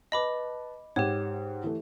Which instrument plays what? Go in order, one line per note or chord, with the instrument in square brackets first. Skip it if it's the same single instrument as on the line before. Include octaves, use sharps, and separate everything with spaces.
[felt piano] B4 A5 [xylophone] D#5 B5 D6
[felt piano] G#2 F#5 G5 [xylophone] G4 C#5
[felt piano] E3 A3